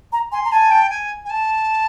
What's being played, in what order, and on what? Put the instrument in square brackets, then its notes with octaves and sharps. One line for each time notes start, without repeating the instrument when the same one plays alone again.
[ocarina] A#5
[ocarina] G#5 [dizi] C6
[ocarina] A#5
[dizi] G#5 [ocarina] A5
[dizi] G5
G#5
G#5
A5